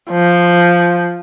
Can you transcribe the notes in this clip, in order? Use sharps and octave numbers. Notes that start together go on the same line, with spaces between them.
F3